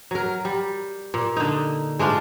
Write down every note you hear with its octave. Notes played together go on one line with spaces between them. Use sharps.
F#3 A#4
G3
A#2
D3 D#4
G#3 A3 D4 F4